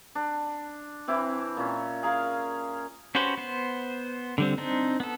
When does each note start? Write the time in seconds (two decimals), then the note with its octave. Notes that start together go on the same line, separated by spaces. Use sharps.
0.15 D4
1.08 E3 C4 E4 D6
1.57 A#2 C#4
2.03 G#4 A#4 F5
3.15 C#4 F#4 G4 B4 C5
3.37 B3 C5
4.38 D3 G3 C4
4.58 C4 D4 D#4
5.00 B3 A4